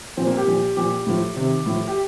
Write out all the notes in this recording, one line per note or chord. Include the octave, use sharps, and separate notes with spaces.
A#2 F3 C4
A#3
G4
A#2 F3
A#2 F3 G4
A2 F3
C3 D#3
A2 F3
G4